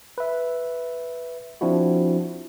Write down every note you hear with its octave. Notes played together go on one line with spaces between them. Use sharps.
B4 E5
F3 C4 D4 E4 F#4